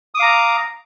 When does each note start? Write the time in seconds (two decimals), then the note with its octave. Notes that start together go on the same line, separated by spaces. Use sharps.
0.14 D#6
0.17 D6
0.20 F5
0.22 A#5